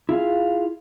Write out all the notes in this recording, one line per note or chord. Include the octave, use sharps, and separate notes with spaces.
E4 F4 G#4 F5